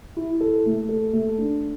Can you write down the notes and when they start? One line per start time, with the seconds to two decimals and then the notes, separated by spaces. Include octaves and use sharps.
0.16 E4
0.40 A4
0.66 A3
0.89 A4
1.13 A3
1.38 D4